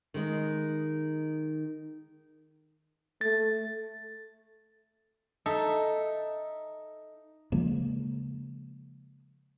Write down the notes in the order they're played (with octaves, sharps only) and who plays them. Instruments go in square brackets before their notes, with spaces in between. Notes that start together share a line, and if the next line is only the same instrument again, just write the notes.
[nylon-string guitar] D#3 G#3
[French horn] A3 [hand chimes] A6
[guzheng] D#4 A4 E5
[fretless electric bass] C#3 F3 G#3 A#3